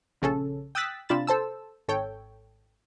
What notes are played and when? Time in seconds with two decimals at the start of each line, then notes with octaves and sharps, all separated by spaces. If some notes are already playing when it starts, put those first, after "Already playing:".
0.22 A#1 C#3 C#4 A4
0.75 G5 D#6 E6 F#6 A6 B6
1.09 C3 D4 F4 B5 A6 E7
1.27 A4 C5 A5 E6
1.88 G#1 A4 C#5 G5